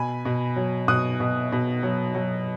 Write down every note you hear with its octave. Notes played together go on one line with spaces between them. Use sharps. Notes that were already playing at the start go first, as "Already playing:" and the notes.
Already playing: B2 G#5 B5
B2
F#3
B2 D#6 F#6
B2
B2
F#3
F#3